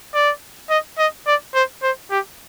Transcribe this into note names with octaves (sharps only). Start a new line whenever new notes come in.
D5
D#5
D#5
D5
C5
C5
G4